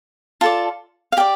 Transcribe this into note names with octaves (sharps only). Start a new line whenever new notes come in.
F4 A4 D5 A5
F5
G4 D5 G5